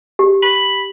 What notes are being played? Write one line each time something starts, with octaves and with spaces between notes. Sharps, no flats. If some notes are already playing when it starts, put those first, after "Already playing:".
G4
B5